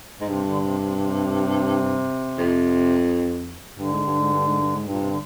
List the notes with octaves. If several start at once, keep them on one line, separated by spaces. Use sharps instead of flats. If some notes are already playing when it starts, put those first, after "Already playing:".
G#2
G2 C3
D3
C3
C3
C3
F2
G2 D3
G#2
G2
G#2
G2
G#2
G2
G#2
G2 A#2
C3
D3